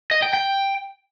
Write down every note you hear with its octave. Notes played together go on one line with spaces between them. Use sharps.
D#5
G5
G5